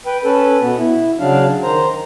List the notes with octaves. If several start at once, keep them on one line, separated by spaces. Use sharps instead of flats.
B4 G5
C#4 A4 B4
B2 B3
E4
C#3 F#3 D4 F5
D#3 C5 A#5